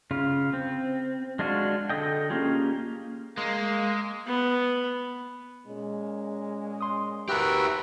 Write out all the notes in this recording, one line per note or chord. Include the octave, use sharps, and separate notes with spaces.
C#3 F4
C4
G#3 D4 F4 F#4
D3 A4 D#5 G5
A#3 C#4 F4 G4 G#4
G#3 A#3
B3
A#2 G#3 C#4
C6 D#6
F#4 G4 A#4 B4 E5